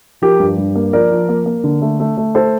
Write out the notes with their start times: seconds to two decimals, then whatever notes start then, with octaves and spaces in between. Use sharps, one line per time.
0.22 F3 G4 A#4
0.40 G2
0.58 G2
0.76 A#3
0.93 F3 A#4 D5
1.11 F3
1.29 A#3
1.46 A#3
1.64 D3
1.82 A3
2.00 A3
2.17 A3
2.35 A4 C5